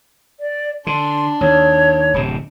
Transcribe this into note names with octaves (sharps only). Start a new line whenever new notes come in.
D5
D3 D4 C6
D#2 C#5
D1 C3